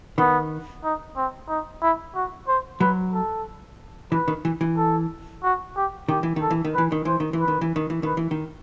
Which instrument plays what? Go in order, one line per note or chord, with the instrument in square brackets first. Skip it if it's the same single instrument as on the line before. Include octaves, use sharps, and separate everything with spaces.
[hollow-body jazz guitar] D#3 [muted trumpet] B3
[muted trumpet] D#4
C4
D#4
E4
F#4
C5
[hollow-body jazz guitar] F#3 [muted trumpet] B4
[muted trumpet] A4
[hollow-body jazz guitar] E3 [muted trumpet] B4
[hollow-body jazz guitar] D#3
E3
E3
[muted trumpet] A4
F#4
G4
[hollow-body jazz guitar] D#3 [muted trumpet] G4
[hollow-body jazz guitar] E3
D#3
[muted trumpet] A4
[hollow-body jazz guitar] E3
D#3
[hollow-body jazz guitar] E3 [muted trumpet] B4
[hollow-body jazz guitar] D#3
[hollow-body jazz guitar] E3 [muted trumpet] C5
[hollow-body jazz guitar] D#3
E3
[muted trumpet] B4
[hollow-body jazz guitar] D#3
E3
D#3
E3
[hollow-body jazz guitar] D#3 [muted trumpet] B4
[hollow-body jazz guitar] E3
D#3